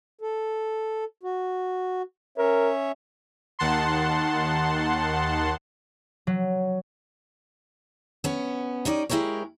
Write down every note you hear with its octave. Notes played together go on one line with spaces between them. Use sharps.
A4
F#4
C#4 A#4 C#5 E5
D#2 D#3 F#5 A5 C6
F#3
B3 C#4
C#4 D#4 G4 D5
G#3 E4 G4 A#4 C#5